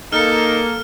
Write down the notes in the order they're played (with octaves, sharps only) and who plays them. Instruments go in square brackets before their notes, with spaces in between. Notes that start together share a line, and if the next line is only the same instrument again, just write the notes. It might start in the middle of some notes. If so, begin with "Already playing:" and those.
[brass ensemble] A#3 [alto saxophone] D#4 [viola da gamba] A4 [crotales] F6